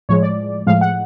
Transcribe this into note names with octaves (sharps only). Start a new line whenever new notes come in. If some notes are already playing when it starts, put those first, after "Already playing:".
A2 F3 G#3 C#5
D5
A2 F3 G#3 F5
F#5